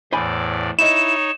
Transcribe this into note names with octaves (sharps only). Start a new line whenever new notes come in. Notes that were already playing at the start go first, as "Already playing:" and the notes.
E2 A2 C5 D5 G#5 B5
D#4 E4 C#5 D#5 E7